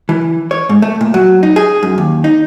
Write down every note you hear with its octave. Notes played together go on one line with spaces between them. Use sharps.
E3
C#5
G#2
A3
A#2
F#3
D#4
G#4
F#2
D#2
D#4